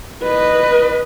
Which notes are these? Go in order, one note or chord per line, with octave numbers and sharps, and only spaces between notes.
B4 D#5